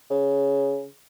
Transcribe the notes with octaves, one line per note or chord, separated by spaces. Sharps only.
C#3